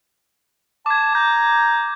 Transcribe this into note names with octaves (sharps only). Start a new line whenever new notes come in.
A5 D6 G#6
A#5 G6